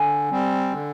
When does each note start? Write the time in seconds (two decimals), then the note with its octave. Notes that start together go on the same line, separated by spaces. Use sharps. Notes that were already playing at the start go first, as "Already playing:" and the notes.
Already playing: D3 G#5
0.30 G3 C4
0.73 D3